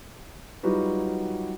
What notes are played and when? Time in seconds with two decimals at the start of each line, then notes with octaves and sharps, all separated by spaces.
0.63 F#3 G3 D#4 F4 F#4 B4